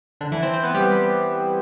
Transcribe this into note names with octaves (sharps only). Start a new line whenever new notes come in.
D3 D4
E3 E4
C4 C5
C4 C5
B3 B4
G3 G4